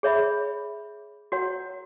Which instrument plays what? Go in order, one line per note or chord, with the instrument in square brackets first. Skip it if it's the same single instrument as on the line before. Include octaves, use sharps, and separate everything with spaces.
[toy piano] G#4 C#5 E5 B5
F#4 A#4 C#5 F#5 A#5